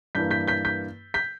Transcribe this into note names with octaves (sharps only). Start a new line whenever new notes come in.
G2 E3 A#3 G6 B6
G6 B6
G6 B6
G6 B6
G6 B6